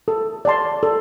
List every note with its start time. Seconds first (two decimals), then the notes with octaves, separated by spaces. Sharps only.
0.08 A4
0.45 D5 A5 C6
0.83 A4